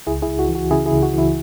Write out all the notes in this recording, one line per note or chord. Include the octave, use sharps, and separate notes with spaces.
C#2 E4 G#4
E4 G#4
C#2
F#4
E3
F#4
C#3 E4 G#4
E4 G#4
C#2
F#4
E3 E4